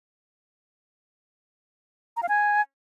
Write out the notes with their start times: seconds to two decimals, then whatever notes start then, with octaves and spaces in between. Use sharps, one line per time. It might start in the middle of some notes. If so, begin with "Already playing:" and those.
2.17 A#5
2.23 F5
2.29 G#5